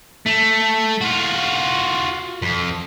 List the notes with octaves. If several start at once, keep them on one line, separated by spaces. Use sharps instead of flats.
A3
F4 F#4
F2